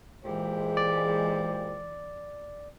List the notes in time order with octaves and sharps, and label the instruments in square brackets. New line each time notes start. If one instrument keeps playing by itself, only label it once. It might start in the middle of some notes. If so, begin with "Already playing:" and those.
[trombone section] A#2 G4 C5 [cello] E3 [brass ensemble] G#3
[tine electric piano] D5